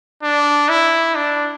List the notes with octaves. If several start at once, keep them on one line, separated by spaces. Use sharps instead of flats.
D4
E4
D4